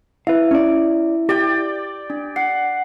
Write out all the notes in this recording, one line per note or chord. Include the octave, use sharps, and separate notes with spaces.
E4 B4 E5 F5
C#4 D5
G4 D5 G5
D4
F#5 C7